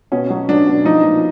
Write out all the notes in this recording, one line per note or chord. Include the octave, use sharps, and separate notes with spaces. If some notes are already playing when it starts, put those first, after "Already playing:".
B2 C#4
F#3
F#3 D4
B2
F3 D#4
A#2